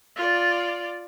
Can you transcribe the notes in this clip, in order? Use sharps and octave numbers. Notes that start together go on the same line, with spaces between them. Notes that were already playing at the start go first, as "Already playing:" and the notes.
F4 D5